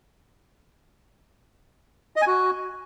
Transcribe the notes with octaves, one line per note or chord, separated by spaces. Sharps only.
D#5
G#5
F#4